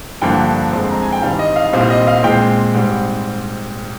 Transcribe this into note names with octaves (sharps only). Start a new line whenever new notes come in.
G2 D3 F3 A#3 G5
F2 D3 G#3 C4
A#5
G#5
G5
G2 D#3 G3 C4 F5
D#5
F5
C2 A#2 G3 C4 F5
D#5
F5
A#2 G#3 C4 G5
G#2 G3 C4